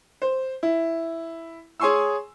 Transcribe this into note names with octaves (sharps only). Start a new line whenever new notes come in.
C5
E4
G#4 C#5 G#5 C6 C#6 E6